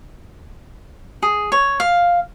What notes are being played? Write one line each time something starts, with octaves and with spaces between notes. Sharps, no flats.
G#4
C#5
F5